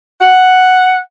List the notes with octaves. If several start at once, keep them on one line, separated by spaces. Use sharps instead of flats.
F#5